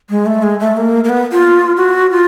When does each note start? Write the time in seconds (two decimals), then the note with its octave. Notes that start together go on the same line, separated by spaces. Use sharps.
0.10 G#3
0.26 A3
0.43 G#3
0.60 A3
0.77 A#3
1.04 A#3
1.09 B3
1.32 F4
1.77 F#4
2.11 F4